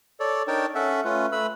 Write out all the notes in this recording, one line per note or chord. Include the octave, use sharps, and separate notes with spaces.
A4 C#5 D5
D4 D#4 A#4 C#5 G5 A5
C#4 A4 E5 F#5
A3 C#4 F4 B4
A3 B4 B5 E6